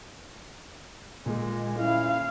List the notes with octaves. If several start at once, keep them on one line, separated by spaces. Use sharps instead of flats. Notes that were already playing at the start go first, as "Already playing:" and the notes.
A#2 G#3
C#4 E4 F5